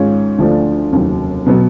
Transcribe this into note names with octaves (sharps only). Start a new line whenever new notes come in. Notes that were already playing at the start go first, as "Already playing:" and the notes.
Already playing: G#2 D#3 G#3 C#4 F4
D2 D3 F3 A3 D4
F1 D#2 C#3 F#3
B2 F#3 B3